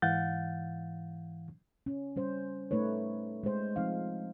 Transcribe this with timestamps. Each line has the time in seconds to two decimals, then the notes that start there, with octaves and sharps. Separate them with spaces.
0.02 G#2 E3 F5 F#5 G6 A6
1.86 C#4
2.16 G3 C#4 C5
2.71 A3 D#4 B4 C#5
3.43 G#3 C5
3.76 F3 C4 D#4 F5